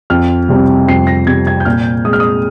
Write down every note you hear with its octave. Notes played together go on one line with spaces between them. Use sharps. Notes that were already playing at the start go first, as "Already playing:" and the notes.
F2 F6
C3 G3 C4
F2 C7
A#6
C3 G3 C4 G#6
G#6
G6
A#2 F6
G#3 C4 D#6
F6
D#6